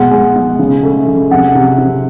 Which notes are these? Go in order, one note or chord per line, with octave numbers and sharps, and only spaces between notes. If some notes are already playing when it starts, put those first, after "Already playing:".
Already playing: B2 G#3 F#5
G#3
G#3
C#3
A3
C#3
C3 F#5
C3
C3